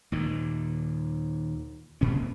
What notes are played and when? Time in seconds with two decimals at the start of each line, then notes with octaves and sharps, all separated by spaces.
0.12 D#2 A#2 D#3
2.01 A#2 C#4